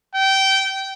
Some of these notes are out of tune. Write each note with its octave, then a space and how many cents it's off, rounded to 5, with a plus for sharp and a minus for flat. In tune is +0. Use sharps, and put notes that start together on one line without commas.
G5 -20